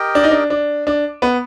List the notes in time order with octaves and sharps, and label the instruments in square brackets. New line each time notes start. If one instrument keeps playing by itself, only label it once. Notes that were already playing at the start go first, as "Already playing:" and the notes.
Already playing: [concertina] G4 A#4 D#5 G5
[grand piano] D4
D#4
D4
D4
D4
B3